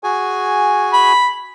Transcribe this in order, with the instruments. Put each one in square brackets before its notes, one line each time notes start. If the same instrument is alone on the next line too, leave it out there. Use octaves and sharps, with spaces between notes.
[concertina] F#4 G#4 G#5
[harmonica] B5